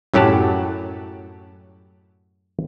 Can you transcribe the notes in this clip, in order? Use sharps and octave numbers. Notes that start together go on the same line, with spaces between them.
F#2 A2 F#3 G4 F#5 A5